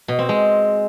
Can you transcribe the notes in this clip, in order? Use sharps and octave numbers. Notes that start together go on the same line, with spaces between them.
B2
C4
G#3